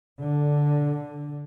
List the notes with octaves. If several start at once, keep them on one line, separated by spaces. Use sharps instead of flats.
D3